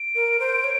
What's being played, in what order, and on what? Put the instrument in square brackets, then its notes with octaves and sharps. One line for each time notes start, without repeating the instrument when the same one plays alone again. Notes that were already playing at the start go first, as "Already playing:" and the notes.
Already playing: [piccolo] D7
[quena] A#4
C5
C#5